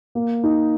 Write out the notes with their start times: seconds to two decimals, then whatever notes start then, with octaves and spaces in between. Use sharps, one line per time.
0.15 A#3
0.44 D#4